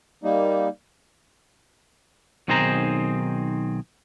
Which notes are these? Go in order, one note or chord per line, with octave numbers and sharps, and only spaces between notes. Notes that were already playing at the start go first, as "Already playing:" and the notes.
G3 A#3 D#4
B1 D#3 C4 G#4 C5 A#5